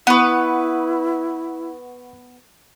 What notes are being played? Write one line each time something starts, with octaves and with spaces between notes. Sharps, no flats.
B3 E4 B4 F#5 C#6